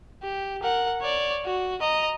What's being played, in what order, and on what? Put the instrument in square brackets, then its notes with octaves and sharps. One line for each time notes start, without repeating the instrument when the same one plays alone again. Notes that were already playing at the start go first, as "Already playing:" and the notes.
[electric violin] G4
A#4 F#5
C#5 D5
F#4
D#5 A#5